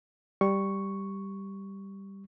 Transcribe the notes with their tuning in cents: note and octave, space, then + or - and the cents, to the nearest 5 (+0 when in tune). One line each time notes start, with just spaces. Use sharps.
G3 +0 C#6 +0